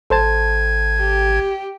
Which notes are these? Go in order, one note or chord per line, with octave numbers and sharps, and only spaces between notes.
G#1 A4 C5 A5 G#6
G4